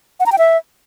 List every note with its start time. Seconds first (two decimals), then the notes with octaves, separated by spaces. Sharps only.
0.20 F#5
0.26 A#5
0.32 G5
0.38 E5